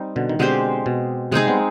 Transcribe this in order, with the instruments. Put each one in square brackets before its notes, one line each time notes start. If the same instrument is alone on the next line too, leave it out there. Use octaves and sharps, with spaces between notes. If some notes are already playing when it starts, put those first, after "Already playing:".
Already playing: [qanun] G3 C4 D#4
[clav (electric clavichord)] B2 D3
D#3
[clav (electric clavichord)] B2 D3 [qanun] G#3 C4 G4 C5
[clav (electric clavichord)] B2
[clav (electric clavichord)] C3 [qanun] G#3 C4 D#4 G#4
[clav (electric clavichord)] G3 B3